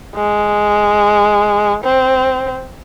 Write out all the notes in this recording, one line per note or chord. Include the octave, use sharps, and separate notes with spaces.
G#3
C4